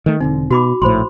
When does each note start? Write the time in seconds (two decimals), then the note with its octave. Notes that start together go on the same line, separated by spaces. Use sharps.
0.06 D#3 A3
0.20 E1 D3 C4 D#4
0.51 B2 F#4 B5 D6
0.82 A#1 A2 C5 B5 C6